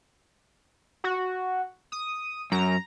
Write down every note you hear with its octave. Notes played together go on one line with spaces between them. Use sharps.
F#4
D#6
F#2 A#5